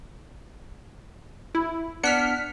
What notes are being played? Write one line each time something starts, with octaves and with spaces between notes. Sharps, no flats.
E4
B3 D4 F#5 F6 B6 C#7